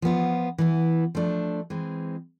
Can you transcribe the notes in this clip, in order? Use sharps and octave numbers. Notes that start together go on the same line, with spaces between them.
F3 B3 F4
E3 B3 E4
F3 A3 D4
E3 G#3 C4